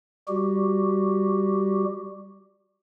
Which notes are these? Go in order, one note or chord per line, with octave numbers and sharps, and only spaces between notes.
G3 F#4 G4